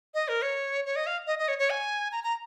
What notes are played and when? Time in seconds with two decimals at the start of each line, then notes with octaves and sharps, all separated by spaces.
0.14 D#5
0.28 A#4
0.42 C#5
0.86 C#5
0.96 D#5
1.07 F5
1.27 D#5
1.39 D#5
1.48 C#5
1.59 C#5
1.70 G#5
2.12 A#5
2.24 A#5